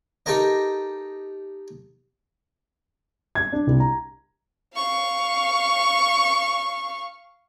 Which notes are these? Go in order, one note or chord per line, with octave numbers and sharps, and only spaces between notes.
D#4 G4 A4 A#4 D#5
G#6
D4
C2
A#5
F5 C#6